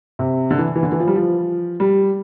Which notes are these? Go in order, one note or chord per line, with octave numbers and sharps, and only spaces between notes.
C3
D3
E3
E3
D3
E3
F3
G3
F3
G3